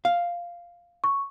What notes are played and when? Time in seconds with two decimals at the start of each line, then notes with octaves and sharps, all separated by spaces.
0.05 F5
1.04 C#6